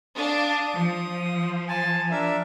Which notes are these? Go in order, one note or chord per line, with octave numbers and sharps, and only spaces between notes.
D4 F5 D#6
F3
G#5 A5
D4 A#4 E5